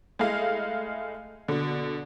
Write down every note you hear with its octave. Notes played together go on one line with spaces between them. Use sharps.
G#3 A3 E4 D#5 F5
B2 D3